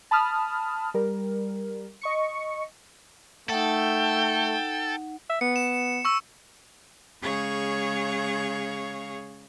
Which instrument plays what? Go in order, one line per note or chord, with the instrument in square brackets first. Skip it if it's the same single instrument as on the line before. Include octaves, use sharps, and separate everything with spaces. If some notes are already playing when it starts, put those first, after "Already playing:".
[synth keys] A5 B5 D#6 F6
G3 A#4
D#5 C#6 C#7
[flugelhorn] A3 [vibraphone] D#4 F#5 [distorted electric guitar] A4 [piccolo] G5
[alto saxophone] E5
[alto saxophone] B3 [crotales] C#7
[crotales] E7
C#6 E6
[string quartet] C#3 G#3 G#4 C#5 F5 C#6